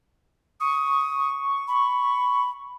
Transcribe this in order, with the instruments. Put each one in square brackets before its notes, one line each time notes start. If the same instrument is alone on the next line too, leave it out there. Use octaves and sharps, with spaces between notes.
[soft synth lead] C#6 [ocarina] D#6
[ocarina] B5